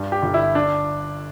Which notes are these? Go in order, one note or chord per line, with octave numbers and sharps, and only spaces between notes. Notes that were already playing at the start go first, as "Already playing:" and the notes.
Already playing: G2
G4
G1
E4
D4